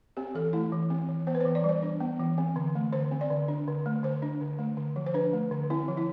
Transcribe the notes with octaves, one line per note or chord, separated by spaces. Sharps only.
C4 G4
E3 A4
A3 E4
E3
C4
E3
B3 C5
B4
C5
E3
D5
G3 C5
D4
B3
E3
C4
D3
A3
D3 C5
C4
D5
D3
D4
D3
A3
D3 C5
D4
D3
A3
D3
F3
C5
D4 B4
A3
D3
C4 E4
F3
E4